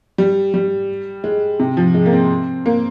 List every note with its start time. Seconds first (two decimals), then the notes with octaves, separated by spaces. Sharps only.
0.18 G3
0.54 G3
1.24 G#3
1.60 C3
1.77 F3
1.94 G#3
2.06 A#3
2.13 C4
2.66 A#3